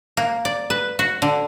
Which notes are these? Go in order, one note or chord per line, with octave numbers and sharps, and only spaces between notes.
A#3
D5
B4
F#4
D3